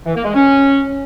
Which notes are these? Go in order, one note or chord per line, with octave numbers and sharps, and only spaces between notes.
E3
A#3
G#3
C#4